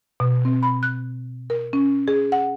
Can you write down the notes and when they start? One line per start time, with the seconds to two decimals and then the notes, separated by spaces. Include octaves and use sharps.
0.20 B2
0.45 C4
0.63 B5
0.83 F#6
1.50 A#4
1.73 C#4
2.08 G#4
2.32 F#5